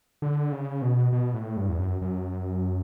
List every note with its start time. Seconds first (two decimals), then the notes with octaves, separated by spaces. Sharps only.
0.22 D3
0.52 C#3
0.82 B2
1.12 B2
1.34 A2
1.57 G2
1.69 E2
1.79 F#2
2.02 F#2